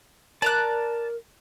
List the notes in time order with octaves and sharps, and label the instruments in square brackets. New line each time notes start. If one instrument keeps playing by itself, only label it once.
[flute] A#4 [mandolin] D5 A#5 F#6 [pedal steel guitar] A5